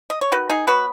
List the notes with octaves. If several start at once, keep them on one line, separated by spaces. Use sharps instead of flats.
D#5
C#5
D#3 F#4 B4
D#4 G#4
F#3 B3 F#4 B4